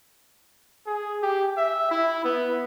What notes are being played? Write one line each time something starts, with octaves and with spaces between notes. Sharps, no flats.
G#4
G4
E5
E4
B3